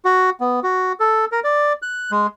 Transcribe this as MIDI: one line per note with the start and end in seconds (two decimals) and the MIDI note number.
0.05 0.30 66
0.40 0.60 59
0.63 0.92 66
1.00 1.25 69
1.32 1.40 70
1.44 1.73 74
1.82 2.11 90
2.11 2.27 56